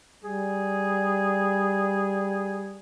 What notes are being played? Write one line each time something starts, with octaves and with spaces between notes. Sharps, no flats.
G3 G#4